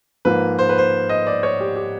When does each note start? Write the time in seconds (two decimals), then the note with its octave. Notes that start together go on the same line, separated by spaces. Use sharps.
0.25 G#2 F3 A#3 B4
0.59 C5
0.69 B4
0.78 C5
1.09 D#5
1.27 D5
1.43 C#5
1.60 G4
1.76 G4